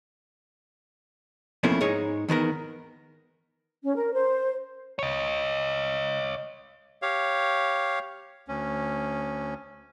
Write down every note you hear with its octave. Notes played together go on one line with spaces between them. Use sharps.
F2 B2 A3 A#3 C#4 E4
G#2 G#3 D#4 G#4 C#5
E2 D#3 B3 A#4
C#4
A#4
C5
C#5 D#5
G4 C#5 F5
D2 C#4